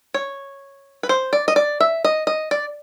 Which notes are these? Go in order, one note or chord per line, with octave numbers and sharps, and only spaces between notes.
C#5
B4
C5
D5
D#5
D5
E5
D#5
D#5
D5